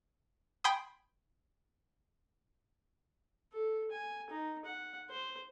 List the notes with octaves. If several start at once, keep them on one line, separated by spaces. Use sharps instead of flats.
G5 G#5 B5 C6 D#6
A4
G#5
D#4
F#5
C5